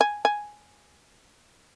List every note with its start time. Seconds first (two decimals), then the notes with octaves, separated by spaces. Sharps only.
0.01 G#5
0.25 G#5